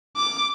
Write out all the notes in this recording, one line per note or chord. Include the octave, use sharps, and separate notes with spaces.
D6